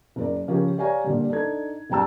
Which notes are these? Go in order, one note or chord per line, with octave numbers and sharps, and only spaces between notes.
F#1 A#4 D5
C#3 F3 C#4 G4 A#4
G4 C#5 D5 F5 G#5 A#5
A#2 D3 G3
D4 D#4 A4 G#6
F#1 G3 G5 A5 E6